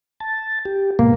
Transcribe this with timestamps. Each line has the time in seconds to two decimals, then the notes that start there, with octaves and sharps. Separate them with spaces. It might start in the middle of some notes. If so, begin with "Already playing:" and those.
0.20 A5
0.65 G4
0.99 G#2 B2 A#3